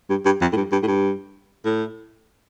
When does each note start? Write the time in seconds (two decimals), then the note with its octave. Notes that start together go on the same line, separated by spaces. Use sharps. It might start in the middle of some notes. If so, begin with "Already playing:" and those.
0.10 G2
0.25 G2
0.41 F2
0.52 A2
0.57 G2
0.72 G2
0.83 A2
0.87 G2
1.65 A2